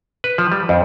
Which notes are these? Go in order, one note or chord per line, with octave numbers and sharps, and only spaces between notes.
B4
F3
G3
F2